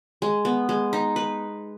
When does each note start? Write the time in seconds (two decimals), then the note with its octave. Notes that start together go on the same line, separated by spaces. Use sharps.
0.22 G#3
0.45 B3
0.69 G#3
0.93 D#4
1.16 B4